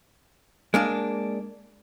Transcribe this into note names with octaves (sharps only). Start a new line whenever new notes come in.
G#3 A#3 D4